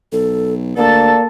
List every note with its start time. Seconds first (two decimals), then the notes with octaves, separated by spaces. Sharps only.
0.12 B1 A4
0.77 D2 A#3 A4 D5 A5